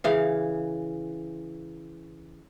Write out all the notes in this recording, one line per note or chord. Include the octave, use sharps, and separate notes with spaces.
C#3 E3 F5